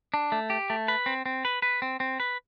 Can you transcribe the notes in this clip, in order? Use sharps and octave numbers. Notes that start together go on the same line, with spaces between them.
D4
A3
G4
A3
B4
C4
C4
B4
B4
C4
C4
B4